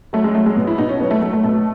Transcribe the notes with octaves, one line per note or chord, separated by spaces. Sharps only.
F#3 A3
G#3
F#3 A3
G#3
B2
E4
B2 D#4
C#4
F#3 B3
A3
F#3 A3
A3
B2 A3